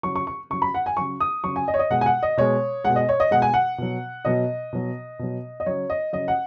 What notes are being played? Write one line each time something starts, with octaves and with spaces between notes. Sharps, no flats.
C#3 F#3 C#6
C#6
C#6
C#3 F#3 C#6
B5
F#5
G#5
C#3 F#3 C#6
D#6
C#3 F#3 C#6
G#5
D#5
C#5
D#5
B2 G#3 F#5
G#5
F#5
D#5
B2 G#3 C#5
B2 G#3 F#5
D#5
C#5
D#5
B2 G#3 F#5
G#5
F#5
B2 F#3
B2 F#3 D#5
B2 F#3
B2 F#3
D#5
C#3 F#3 C#5
D#5
C#3 F#3 D#5
F#5